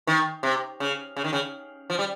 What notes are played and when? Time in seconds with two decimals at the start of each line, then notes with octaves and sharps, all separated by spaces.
0.07 D#3
0.43 C3
0.80 C#3
1.16 C#3
1.24 D#3
1.33 C#3
1.90 F3
1.99 G3